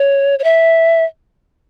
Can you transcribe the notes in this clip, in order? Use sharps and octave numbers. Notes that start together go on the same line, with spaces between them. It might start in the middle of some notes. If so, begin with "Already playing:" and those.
Already playing: C#5
C#5
E5